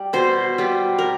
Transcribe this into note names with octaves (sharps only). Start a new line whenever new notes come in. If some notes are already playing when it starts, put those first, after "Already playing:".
Already playing: G3
B2 C5
G3 B3
A#4